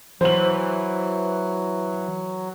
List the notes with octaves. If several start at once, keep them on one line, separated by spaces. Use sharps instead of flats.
E3 F#3 C5 F#7